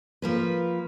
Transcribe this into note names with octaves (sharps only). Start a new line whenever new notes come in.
F3 A#3 B4